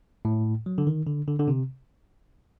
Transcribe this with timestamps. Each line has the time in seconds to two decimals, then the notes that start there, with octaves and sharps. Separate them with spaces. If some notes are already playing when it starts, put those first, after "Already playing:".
0.25 A2
0.66 F#3
0.78 D3
0.87 D#3
1.07 D3
1.28 D3
1.39 D3
1.48 C3